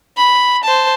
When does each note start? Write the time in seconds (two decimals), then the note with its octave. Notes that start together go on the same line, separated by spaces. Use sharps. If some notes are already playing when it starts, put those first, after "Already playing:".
0.17 B5
0.64 C5 A5